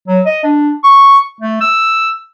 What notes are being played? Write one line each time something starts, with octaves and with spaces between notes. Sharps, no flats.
F#3
D#5
D4
C#6
A3
E6